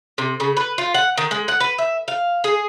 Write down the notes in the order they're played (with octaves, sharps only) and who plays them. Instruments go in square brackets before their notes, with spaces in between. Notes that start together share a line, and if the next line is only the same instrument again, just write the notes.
[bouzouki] C3
C#3
B4
F4
F#5
D#3
G#3
F#5
B4
E5
F5
G#4